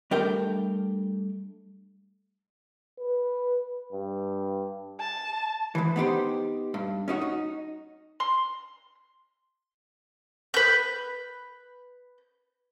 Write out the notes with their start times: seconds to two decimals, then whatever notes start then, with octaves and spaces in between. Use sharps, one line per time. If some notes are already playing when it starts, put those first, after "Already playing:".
0.11 G3 A3 D4 A#4 G5
2.99 B4
3.92 G2
5.00 A5
5.75 G#2 E3
5.96 B3 D#4 G4 C5
6.74 G2
7.08 C#4 D#4 F#4
7.22 D#4
8.20 C6
10.54 B4 G6